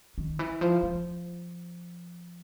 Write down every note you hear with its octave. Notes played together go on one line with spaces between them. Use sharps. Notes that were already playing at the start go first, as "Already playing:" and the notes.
D#3
E3
F3
F3